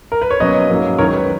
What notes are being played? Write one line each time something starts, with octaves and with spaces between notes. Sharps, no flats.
A#4
B4
C#5
B2 F#3 A#3 C#4 B4 D#5
G#2 F#3 A#3 C#4
F#2 D#3 G#3 A#4 C#5
B4